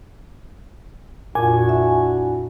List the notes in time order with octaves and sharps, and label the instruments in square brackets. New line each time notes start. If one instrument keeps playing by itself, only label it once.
[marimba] F2 A#2 [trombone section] D4 E4 F#4 [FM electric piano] G#5
[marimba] E5